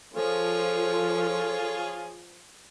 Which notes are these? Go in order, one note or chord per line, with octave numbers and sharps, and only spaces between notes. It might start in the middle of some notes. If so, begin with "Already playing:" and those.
F3 F4 G#4 A4 C#5